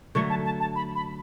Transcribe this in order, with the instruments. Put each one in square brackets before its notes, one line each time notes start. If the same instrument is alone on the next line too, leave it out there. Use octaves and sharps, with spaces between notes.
[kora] D3 F#3 A3 [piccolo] C#6
[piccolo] A5
A5
A5
B5
B5